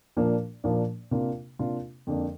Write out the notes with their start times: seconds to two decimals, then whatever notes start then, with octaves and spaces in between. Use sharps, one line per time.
0.17 A#2 F3 A#3 D4
0.64 A#2 F3 A#3 D4
1.11 C3 A#3 D4 F4
1.59 C3 A#3 D4 F4
2.07 F2 D3 A#3 D4